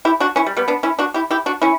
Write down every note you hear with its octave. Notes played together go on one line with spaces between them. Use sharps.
E4 G4
D4 F#4
C#4 E4
G3
G3 B3
B3 D4
C#4 E4
D4 F#4
E4 G4
E4 G4
D4 F#4
C#4 E4